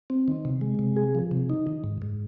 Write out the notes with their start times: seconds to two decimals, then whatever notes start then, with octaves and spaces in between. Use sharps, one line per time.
0.10 C4
0.28 D#3
0.45 C3
0.61 G#3
0.79 C3
0.96 G#4
1.15 F3
1.31 C3
1.50 D#4
1.67 D#3
1.84 G#2
2.02 G#2